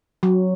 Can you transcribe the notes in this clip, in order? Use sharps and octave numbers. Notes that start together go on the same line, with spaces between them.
F#3